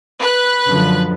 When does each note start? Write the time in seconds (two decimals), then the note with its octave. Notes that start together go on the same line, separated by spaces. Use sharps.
0.19 B4 F#6
0.67 F#2 D3 F3